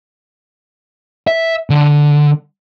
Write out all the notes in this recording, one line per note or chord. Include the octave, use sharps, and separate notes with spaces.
E5
D3